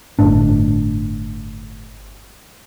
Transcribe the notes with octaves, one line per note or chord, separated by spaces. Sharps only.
G1 A2 D4